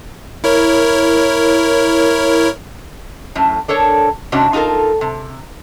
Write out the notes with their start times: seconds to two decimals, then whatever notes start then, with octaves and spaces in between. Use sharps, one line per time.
0.44 E4 A#4 C#5
3.35 F#2 A2
3.68 D4 A4 A#4 C#5
4.32 G#2 C3 C#4 D4 F#4
4.53 D#4 F4 F#4 A4 A#4
5.01 C3